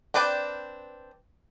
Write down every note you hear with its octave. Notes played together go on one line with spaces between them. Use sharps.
C4 D4 B4 D5 G5